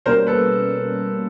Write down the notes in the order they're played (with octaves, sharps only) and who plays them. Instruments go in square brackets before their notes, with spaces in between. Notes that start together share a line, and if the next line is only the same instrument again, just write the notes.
[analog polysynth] B2 G3 A#3 C#4 [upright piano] A#4 C5
[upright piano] A4 B4